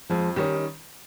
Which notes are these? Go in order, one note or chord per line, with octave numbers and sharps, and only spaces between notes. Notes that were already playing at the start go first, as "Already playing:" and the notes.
F2 F3 G#3
D#3 G3 C#4 D#4 G4